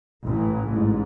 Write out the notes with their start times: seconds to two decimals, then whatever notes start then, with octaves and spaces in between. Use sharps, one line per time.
0.24 A1 A2 E3
0.70 A1 G#2